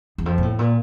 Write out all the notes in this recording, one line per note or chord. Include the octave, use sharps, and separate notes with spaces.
E2
F2
A#2
A2
A#2